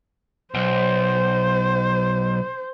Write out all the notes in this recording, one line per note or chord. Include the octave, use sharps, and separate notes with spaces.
B1 C5